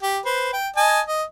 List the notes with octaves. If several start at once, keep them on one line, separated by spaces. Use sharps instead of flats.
G4
B4 C5
G5
D#5 G#5 A5
D#5